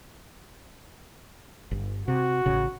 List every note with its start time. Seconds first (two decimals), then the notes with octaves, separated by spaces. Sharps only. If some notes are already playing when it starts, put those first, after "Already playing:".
1.71 G1
2.08 C3 F#4
2.46 A1 C#3